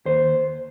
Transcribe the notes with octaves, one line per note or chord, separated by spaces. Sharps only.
D#2 C5